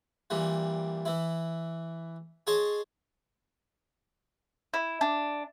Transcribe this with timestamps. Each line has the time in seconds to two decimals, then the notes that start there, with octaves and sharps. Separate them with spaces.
0.30 A#2 E3 G3
1.05 E3 E4
2.47 G#4 C#5 D#5 G#5 A5 C6
4.74 E4
5.01 D4